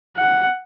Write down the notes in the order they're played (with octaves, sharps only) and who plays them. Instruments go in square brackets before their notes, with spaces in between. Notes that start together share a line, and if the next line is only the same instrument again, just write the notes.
[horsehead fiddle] F#5